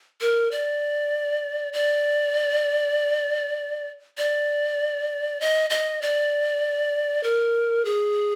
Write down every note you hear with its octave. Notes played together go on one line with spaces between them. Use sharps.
A#4
D5
D5
D5
D#5
D#5
D5
A#4
G#4